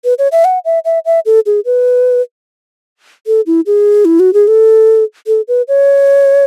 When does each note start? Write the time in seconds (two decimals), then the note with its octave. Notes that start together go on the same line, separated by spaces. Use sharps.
0.05 B4
0.19 C#5
0.32 E5
0.45 F#5
0.65 E5
0.85 E5
1.06 E5
1.26 A4
1.46 G#4
1.65 B4
3.27 A4
3.47 E4
3.66 G#4
4.05 E4
4.20 F#4
4.33 G#4
4.48 A4
5.27 A4
5.48 B4
5.68 C#5